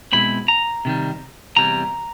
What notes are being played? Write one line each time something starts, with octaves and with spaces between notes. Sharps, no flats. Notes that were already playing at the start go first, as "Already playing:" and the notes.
B2 G#3 C4 E4 B5
A#5
C3 D#3 G3
E2 C3 E3 G3 A#5